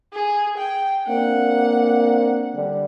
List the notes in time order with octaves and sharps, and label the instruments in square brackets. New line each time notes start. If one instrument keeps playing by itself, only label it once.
[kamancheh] G#4
G5
[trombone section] A#3 C4 D4 [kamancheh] F#5
[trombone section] D3 G3